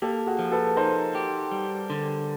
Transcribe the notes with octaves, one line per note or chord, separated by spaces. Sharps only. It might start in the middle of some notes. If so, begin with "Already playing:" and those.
A#3 G4 A4
F#4 G#4
F3
A4 B4
D#4 A#4 C5
G4
G3
D3